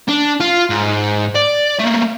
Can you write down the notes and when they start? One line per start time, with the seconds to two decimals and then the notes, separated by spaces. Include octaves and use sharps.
0.08 D4
0.40 F4
0.70 G#2
1.35 D5
1.80 A3 A#3